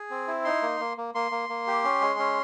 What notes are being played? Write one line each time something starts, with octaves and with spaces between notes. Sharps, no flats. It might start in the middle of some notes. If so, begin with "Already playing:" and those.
Already playing: G#4
C4
E4
D#4 C6
A#3
A#3
A#3
A#3 C6
A#3
A#3
G4
C#4
G#3
C#4